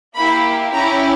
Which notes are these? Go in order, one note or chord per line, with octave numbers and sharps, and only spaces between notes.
A#3 E4 G4 B5
C#4 E4 G4 A#5